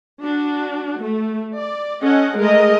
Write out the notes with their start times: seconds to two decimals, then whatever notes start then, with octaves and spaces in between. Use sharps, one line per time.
0.22 D4 F#4
1.01 A3
1.55 D5
2.02 C#4 A4 D#5 F#5
2.37 G#3 A3 A#4 D#5